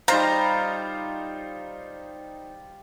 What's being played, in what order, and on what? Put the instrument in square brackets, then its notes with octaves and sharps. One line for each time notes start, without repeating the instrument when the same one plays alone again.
[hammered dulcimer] G3 F4 [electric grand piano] D#4 C5 F5 [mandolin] A#5